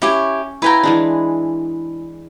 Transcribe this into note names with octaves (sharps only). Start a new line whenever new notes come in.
C#4 E4 G4 G#5
E4 B4 F5 G5 G#5 A#5
E3 G#3 D4